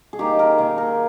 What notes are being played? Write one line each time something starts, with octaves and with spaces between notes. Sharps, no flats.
G#4
D#3 A#3 D#4 G4
A#4
D#3 A#3 D#4 G#4
A#4